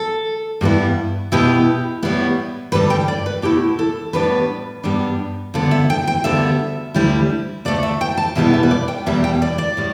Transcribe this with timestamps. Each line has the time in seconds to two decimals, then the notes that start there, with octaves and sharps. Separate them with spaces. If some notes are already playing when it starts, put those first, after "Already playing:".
Already playing: A4
0.61 G2 G3 B3 E4
1.32 B2 B3 E4 G4
2.03 A2 G3 B3 E4
2.72 G2 D3 G3 B4
2.90 G5
3.08 D5
3.26 B4
3.42 B2 A3 E4 G4
3.79 A4
4.13 A2 G3 B3 D4 B4
4.84 G2 G3 B3 D4
5.54 G2 D3 B3
5.71 E5
5.90 G5
6.08 G5
6.24 D2 D3 G3 B3 E5
6.94 D2 D3 G3 E4
7.65 D2 D3 A3 D5
7.83 E5
8.01 G5
8.17 A5
8.35 E2 B2 G3 B3 E4 E5
8.54 E5
8.63 B4
8.71 D5
8.88 G5
9.06 E2 B2 G3 E5
9.24 G5
9.42 D5
9.58 D5
9.77 A2 G3